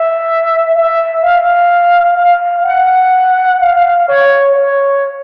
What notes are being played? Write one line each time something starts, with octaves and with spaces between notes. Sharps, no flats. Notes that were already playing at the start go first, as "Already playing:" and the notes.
Already playing: E5
E5
F5
F5
F#5
F5
C#5
C#5